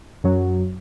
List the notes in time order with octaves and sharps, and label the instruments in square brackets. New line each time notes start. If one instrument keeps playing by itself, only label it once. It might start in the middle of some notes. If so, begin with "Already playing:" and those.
[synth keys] F#2 F#3